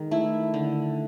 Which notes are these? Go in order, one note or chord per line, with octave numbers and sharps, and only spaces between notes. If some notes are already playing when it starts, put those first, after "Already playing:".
Already playing: D#3 G#3
A3 E4
D3